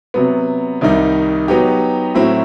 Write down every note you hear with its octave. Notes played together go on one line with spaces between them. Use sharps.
C3 F#3 B3
C2 C3 D#3 G3 D#4
F#3 B3 D#4 G4
A2 F#3 C4 E4